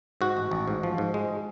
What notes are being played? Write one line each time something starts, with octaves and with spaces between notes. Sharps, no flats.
G#2 F#4
A1
A1
G#2
F3
G#2
G#3